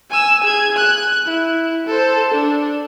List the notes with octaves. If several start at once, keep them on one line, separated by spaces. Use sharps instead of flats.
G#5 E6
G#4 G#6
F#6
E4
A4 C5
D4